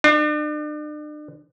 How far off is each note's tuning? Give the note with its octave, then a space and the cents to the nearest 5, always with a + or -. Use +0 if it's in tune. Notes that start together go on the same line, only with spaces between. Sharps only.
D4 +40